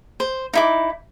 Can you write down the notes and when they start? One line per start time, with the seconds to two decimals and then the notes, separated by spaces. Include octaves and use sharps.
0.20 C5
0.53 D#4 E4 D6